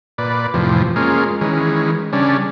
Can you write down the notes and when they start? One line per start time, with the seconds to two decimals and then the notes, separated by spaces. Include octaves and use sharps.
0.18 A#2 B4 D5
0.54 F2 A2 C3 E3 F3
0.96 G#3 A#3 C#4 F4
1.41 D#3 E3 G#3 C#4
2.13 C#3 G3 C#4 D4